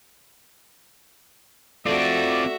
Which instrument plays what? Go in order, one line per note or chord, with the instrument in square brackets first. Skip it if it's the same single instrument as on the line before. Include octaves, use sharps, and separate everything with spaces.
[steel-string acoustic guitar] A3 D4 [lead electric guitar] C4 F4 [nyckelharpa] F#4 E5 [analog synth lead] D5